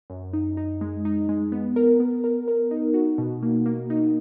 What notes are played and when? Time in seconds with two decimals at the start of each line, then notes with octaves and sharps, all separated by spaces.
0.10 F#2
0.33 D#4
0.57 D#4
0.81 G#3
1.05 D#4
1.29 G#3
1.52 B3
1.76 A#4
2.00 B3
2.24 A#4
2.48 A#4
2.71 D#4
2.94 F#4
3.18 B2
3.43 A#3
3.66 A#3
3.90 D#4